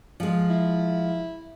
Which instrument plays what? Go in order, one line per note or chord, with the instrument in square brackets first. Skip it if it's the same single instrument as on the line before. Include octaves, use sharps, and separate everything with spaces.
[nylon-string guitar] F3 G#3
[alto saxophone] E4